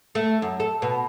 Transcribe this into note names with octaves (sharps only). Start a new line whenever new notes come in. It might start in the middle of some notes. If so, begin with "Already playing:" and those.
A3
F#2
A4
B2